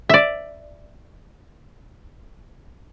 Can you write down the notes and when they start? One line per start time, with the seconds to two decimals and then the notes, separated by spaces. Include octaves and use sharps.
0.09 D5 E5